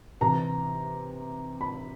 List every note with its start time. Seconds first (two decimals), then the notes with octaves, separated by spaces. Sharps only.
0.21 C3 E3 A#5
1.61 B5